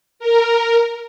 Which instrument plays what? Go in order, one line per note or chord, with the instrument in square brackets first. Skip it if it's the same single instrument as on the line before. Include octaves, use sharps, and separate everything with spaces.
[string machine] A#4